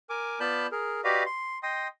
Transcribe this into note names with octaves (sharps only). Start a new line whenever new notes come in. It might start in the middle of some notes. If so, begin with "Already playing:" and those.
A#4 G#5 D6
B3 F4 D5 A5 B5 G6
G#4 A#4
F#4 G4 B4 D5 D#5 F5
C6
D#5 G5 C6 D#6